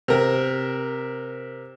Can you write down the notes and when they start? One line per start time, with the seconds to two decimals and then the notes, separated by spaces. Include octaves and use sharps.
0.08 C3 A#4